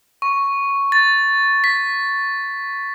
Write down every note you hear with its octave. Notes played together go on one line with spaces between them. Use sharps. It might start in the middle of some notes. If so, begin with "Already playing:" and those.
C#6
A6
B6